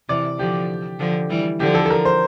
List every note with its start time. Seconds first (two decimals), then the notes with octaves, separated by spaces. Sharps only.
0.09 C3 E3 D5
0.39 D3 F3 G4
1.00 D3 F3
1.30 E3 G3
1.60 D3 F3 G4
1.75 A4
1.86 A4
1.90 A#4
2.05 C5